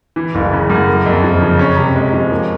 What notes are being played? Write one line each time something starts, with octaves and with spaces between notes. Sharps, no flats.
E3
F#1
C#3
F#2
A#3
F2
F3
C#3
C#4
C3
G#3
F3
A#3